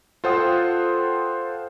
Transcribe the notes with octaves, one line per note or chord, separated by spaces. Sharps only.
F4 A4 C5 F#5 G5 D#6